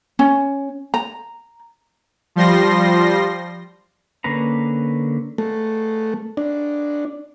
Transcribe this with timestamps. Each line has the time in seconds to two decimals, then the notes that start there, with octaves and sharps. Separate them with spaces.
0.19 C#4
0.94 A#5
2.36 F3 G3 C6 A#6
4.24 D3 A#3 C#4 B4 A#5
5.38 A3
6.37 D4